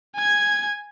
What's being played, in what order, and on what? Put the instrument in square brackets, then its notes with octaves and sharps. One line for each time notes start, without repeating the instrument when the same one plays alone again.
[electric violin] G#5 G#6